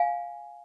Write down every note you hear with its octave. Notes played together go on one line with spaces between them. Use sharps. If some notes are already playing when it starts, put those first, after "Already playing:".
Already playing: F5 G#5